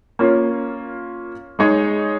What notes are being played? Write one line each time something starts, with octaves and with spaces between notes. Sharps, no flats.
A#3 C#4 F4
G#3 D#4 G#4 C#5